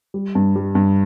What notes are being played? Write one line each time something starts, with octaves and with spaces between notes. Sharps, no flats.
G3
G2
G3
G2